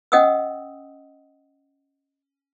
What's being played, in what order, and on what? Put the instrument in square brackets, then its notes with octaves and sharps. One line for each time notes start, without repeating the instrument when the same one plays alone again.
[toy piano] C#4 D#5 F#5 G5 D#6 E6